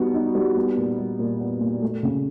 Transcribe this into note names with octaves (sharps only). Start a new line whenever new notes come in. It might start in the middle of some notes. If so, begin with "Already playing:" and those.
Already playing: G3 B3 D#4 F#4
D#4
G3
B3
A#2
G3
A#2
B3
A#2
A3
C#3